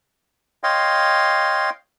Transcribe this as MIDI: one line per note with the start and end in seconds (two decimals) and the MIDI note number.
0.63 1.70 73
0.63 1.70 75
0.63 1.70 77
0.63 1.70 79
0.63 1.70 84